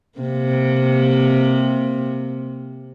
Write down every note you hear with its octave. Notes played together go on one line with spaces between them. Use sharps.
C3 A#3